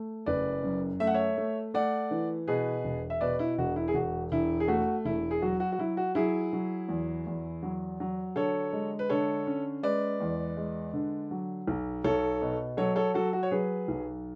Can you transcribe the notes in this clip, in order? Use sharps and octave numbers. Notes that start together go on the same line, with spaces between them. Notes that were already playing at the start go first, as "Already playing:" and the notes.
Already playing: A3
F#1 B4 D5
F#2
A3 E5
F#5
C#5 E5
A3
A3 D5 F#5
E3
B2 G#4 B4
E1
E5
B2 B4 D5
E4
E1 F#4
E4
G#4
E1 F#4
E1 E4
G#4
A3 F#4
E1 E4
G#4
F#3 F#4
F#4
F#4
F#3 E4
F#4
F#3 E4 G#4
F#3
E2
E2
F#3
F#3
D3 A4 C#5
G#3
B4
D3 A4 C#5
C#4
G#3 B4 D5
E2
G#3
D3
F#3
B1
B1 A4 C#5
B2
F#3 A4 C#5
A4 C#5
F#3 F#4 A4
F#4
C#5
F#3 G#4 B4
B1